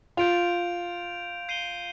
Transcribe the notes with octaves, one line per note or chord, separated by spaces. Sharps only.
F4 G6 D7 F7
G6 C7 D#7 G7